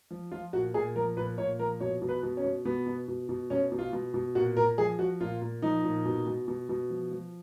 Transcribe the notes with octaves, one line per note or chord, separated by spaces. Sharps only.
F3
F3 F4
A#2 F#4
A#2 G#4
F3 A#4
A#2 B4
A#2 C#5
F3 A#4
B2 C#5
B2
B4
B2
C#4
B2
B2 B3
B2
B2
B2
B2 C#4
B2
F4
B2
B2
A#2 F#4
A#2 A#4
F3 G#4
F3 F#4
A#2 F4
A#2
F3 D#4
A#2
B2
B2
B2
B2
F3
F3